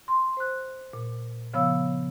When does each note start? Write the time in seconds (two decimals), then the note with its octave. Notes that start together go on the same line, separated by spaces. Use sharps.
0.08 C6
0.37 C5 F#6
0.93 A#2
1.54 C#3 F3 B3 C#5 F5 E6